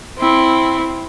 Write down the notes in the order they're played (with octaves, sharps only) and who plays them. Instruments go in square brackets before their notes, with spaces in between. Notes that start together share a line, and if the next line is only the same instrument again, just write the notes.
[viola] C4 E4